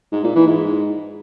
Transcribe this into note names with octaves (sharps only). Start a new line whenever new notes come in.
G#2
A#2
E3
G#2